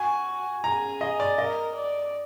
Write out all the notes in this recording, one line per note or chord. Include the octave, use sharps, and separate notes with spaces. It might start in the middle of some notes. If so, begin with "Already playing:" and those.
Already playing: F#4 G#5
G#4 A#5
D#5
D5
A#4 D#5
D5